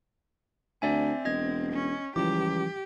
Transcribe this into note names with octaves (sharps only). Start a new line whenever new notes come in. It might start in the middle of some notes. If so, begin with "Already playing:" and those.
D2 C4 D5 E5 G#5
E1 D#5 G#6
C#4
C#2 E3 F3 G3 G4 D6